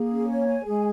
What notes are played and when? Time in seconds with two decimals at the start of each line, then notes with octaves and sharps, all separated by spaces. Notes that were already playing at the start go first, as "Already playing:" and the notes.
Already playing: A#3 G#4
0.10 C#4
0.28 C#5
0.47 G#5
0.65 G#3 G#4